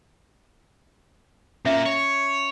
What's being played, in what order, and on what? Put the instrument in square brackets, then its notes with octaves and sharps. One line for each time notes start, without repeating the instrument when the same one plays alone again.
[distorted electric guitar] A#2 A#3 [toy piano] C#4 E5
[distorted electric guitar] C#5